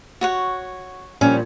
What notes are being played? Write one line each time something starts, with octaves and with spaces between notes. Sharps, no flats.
F#4 C#5 F#5
A#2 F3 G3 C#4